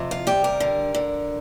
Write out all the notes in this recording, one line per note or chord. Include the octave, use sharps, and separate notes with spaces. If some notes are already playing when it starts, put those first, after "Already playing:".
Already playing: F2 C3
F4
G3 G4
A#4
D3
D3